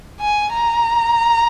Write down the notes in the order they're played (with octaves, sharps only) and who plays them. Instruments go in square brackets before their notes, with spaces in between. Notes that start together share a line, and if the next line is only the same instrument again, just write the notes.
[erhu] G#5
A#5